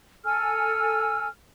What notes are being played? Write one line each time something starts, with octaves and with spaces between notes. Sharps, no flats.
A4 G#5 E6 F6